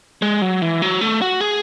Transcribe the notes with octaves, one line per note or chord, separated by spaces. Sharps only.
G#3
F#3
E3
F#3
A3
F#4
G#4